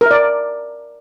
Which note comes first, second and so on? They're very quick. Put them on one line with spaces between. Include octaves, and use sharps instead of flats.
A#4 E5 D5